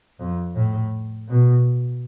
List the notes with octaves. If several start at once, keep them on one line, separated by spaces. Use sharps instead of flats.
F2
A2
B2